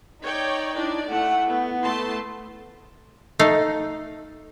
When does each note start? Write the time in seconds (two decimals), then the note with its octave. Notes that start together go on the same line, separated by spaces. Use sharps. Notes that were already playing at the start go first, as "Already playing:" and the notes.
0.23 D#4 C#5 D5 G5
0.75 D4 E4 D5
1.10 A3 E4 F#5
1.47 B3
1.83 A3 A5 C6
3.39 A3 D#4 F5